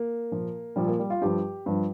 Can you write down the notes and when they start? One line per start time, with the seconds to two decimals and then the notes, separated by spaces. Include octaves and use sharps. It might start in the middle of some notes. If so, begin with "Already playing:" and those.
Already playing: A#3
0.31 A#2 F3
0.76 A#2 F3 G3
0.88 A#3
0.99 G3
1.10 F4
1.21 G2 F3 G4
1.66 G2 F3